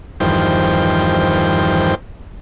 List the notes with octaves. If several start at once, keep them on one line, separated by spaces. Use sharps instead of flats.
E2 G2 D#3 F3 C5 G5